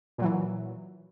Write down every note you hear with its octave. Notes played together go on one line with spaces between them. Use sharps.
A#2 E3 F#3